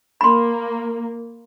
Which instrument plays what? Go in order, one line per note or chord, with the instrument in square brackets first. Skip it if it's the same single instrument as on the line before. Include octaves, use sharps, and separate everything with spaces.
[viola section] A#3 [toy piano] B5 C6